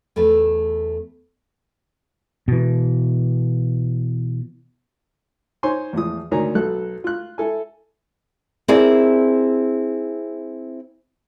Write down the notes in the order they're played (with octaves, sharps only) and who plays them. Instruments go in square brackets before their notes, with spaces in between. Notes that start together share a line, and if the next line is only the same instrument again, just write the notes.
[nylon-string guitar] E2 A3 A4 B4
[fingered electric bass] B2 E3
[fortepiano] D#4 C5 C#5 G#5 C6
E2 A2 F3 D#6
D2 D#3 D#4 C#5 G#5 A#5
B1 A4 F#6
F4 F#6
E4 A4 G#5
[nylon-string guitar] C4 E4 G#4 A#4 D5